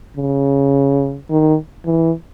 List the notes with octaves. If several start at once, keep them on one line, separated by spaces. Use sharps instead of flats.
C#3
D#3
E3